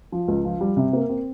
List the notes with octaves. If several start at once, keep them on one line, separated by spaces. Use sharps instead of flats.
F3
C#2
F3
G3
C3
A#3
C4